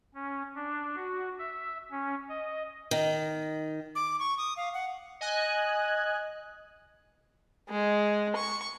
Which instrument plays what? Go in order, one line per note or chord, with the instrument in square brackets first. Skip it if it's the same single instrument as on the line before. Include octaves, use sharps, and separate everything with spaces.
[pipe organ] C#4
D4
F#4
E5
C#4
D#5
[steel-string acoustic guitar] D#3
[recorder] D6
C#6
D#6
F5
F#5
[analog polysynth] D#5 G#5 F#6
[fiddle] G#3
C#6